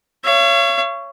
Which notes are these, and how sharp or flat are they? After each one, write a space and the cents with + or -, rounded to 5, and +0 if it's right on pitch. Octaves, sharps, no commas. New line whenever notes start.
C#5 +5 F5 -45